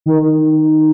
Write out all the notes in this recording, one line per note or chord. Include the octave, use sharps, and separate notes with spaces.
D#3